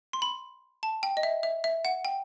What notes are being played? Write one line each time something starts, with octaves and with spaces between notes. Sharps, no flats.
C6
B5
A5
G5
D#5
E5
E5
E5
F#5
G5